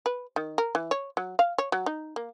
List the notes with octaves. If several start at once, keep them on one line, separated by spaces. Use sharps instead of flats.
B4
D#3
A#4
E3
C#5
F#3
F5
C#5
F#3
D#4
A#3